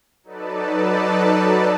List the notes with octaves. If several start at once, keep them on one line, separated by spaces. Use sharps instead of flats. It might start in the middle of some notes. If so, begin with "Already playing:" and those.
F#3 D#4 A4 B4 D5 A5